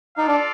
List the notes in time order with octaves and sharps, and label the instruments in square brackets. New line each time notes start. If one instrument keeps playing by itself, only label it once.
[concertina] D#4 [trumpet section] F4 A4 D5 F5
[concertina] D4